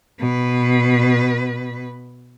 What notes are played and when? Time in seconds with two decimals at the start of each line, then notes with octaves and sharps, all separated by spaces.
0.20 B2 B4